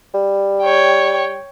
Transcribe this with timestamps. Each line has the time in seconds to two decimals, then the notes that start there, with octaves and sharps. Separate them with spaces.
0.14 G3
0.62 C#5 G5